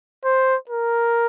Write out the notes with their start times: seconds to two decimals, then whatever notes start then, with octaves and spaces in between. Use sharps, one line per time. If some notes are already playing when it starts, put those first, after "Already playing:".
0.25 C5
0.70 A#4